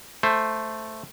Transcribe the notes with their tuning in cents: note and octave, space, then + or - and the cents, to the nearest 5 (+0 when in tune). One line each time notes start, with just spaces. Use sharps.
A3 +0 C5 +0